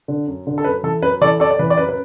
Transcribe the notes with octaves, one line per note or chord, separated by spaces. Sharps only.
D3
F#2
D3
A4
F#2 B4
E3 A4
F#2 B4
E3 A4 D5
F#2 A4 D5
D5
E3 B4
D5
F#2 B4
B4